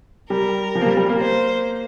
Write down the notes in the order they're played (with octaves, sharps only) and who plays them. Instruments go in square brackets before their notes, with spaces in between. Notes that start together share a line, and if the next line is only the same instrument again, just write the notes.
[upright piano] G3 [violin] A#4
[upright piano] F3
A#3
G3
G3
A#3
[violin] C5